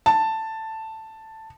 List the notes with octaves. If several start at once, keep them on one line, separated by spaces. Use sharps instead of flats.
A5